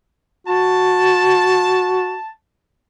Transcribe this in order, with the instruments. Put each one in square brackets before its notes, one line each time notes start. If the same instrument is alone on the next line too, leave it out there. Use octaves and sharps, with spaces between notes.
[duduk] F#4 [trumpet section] A5